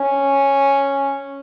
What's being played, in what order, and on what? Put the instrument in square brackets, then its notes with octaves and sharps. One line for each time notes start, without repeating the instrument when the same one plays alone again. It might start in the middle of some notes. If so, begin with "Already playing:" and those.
Already playing: [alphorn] C#4